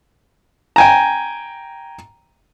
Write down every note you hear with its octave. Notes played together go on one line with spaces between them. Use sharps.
G5 G#5 A#5